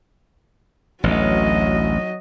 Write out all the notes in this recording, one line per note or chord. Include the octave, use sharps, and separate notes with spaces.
A1 D2 F#3 D#5